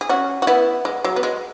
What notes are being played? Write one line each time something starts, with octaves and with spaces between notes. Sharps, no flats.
G#4
C#4 F#4
F#4
B3 E4
G#3
F#3
B3
G#3